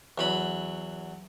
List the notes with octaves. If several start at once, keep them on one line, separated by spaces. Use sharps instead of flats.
E2 F#3 B5